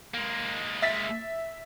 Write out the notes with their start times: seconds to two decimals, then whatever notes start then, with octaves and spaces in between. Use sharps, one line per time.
0.14 G#3 A#3
0.82 E5 A6 B6